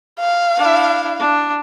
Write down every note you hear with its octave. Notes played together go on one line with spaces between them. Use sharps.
F5
D4 E4
D4